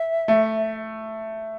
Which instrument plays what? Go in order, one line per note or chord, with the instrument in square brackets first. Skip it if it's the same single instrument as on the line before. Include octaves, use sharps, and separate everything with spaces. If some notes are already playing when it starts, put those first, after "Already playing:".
Already playing: [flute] E5
[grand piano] A3